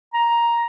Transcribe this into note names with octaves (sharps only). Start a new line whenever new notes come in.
A#5